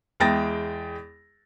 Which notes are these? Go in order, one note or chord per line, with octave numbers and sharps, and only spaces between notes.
E2 G#3 G5 A6 A#6